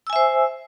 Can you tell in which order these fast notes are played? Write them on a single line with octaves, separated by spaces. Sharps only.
E6 G#5 E5 C5